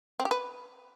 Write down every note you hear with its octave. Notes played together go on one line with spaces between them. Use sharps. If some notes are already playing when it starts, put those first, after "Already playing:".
C4
G4
B4